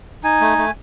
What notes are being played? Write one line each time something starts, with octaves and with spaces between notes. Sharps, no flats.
D#4 G#5
A3
A3